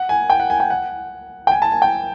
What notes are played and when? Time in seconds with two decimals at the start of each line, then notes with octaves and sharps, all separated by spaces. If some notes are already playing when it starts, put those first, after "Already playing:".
Already playing: F#5
0.09 G#5
0.30 G5
0.40 F#5
0.50 G#5
0.60 G5
0.70 F#5
1.47 G5
1.52 G#5
1.62 A5
1.72 G#5
1.82 G5